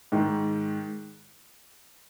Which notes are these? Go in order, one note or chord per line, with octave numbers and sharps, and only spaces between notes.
G#2 D#3